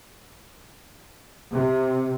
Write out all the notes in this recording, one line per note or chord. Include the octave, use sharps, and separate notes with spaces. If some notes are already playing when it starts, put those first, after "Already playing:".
C3